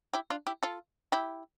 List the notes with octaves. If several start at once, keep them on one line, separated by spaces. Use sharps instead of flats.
E4 G4
D4 F4
E4 G4
F4 A4
E4 G4